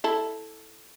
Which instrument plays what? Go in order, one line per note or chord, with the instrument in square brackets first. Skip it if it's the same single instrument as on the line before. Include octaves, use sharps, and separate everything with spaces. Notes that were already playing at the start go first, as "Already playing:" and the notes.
[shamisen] E4 A4